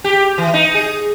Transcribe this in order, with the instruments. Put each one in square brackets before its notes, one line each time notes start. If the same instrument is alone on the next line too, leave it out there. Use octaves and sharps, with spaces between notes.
[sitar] G4
E3
D#4
G#4